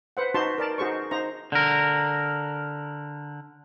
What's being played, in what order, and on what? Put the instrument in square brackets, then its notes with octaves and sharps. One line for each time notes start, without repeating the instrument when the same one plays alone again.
[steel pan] B4 C5 F#5
D#4 F#4 B4 C5 A5 C6
A#4 D5 A5
D#4 F#4 G#4 C5 C#6
D#4 C5 A#5
[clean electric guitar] D3 A#4